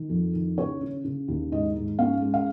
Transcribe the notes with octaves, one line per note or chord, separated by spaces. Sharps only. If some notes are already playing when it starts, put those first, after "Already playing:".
Already playing: D#3
F2
D#3
C#3 C#5
C#3
C#3
D#2
G#2 D#5
G#2
C#4 F5
G#3
F5